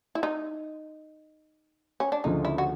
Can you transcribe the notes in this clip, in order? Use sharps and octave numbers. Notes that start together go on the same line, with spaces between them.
E4
D#4
C#4
D4
D2 C#3 F3 D#4
E4
F#4